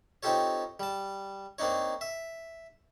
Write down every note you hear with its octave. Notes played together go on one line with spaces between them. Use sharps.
C4 D#4 F4 G4 A4 C#5
G3 A5
A#3 C4 D4 D#4 C#5
E5